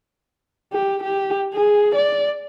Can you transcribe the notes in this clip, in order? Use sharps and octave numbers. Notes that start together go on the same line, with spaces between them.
G4
G4
G#4
D5